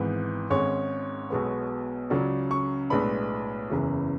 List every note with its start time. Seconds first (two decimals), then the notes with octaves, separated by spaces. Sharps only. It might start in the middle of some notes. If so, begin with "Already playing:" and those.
Already playing: G#1 G#2 E3 B3
0.50 G#1 G#2 G#3 C#4 C#5
1.30 B1 B2 G#3 B3
2.10 C#2 C#3 F#3 C#4 D5
2.51 C#6
2.90 B1 A2 G#3 B3 D4 B5
3.70 F#1 E2 C#3 E3